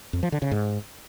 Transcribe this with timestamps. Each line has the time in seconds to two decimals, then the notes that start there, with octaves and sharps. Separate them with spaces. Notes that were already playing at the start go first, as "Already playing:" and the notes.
0.13 F2
0.23 F3
0.32 D3
0.42 C#3
0.51 G#2